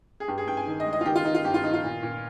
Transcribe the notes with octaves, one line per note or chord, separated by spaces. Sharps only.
G#4
G2 G4
G#4
G2 G5
G#5
D#3
D#5
G#3
D#5
F4
D#3 G4
F4
D#3 D#4
F4
G2 G4
F4
D#3 D#4
F4
A#2
A#2